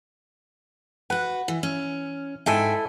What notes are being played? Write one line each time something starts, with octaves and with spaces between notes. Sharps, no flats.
F#4 B4 F#5
E3
C#4
G#2 E4 A4 E5 G5 G#5